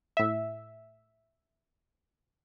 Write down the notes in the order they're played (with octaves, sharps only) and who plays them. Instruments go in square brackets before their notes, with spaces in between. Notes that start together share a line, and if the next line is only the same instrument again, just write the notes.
[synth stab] A2 E5